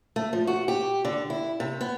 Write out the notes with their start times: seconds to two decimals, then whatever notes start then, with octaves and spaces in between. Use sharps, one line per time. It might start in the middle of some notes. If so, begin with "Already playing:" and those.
0.16 A3
0.33 F3
0.47 F#4
0.68 G4
1.05 D3
1.30 E4
1.60 C3
1.81 B3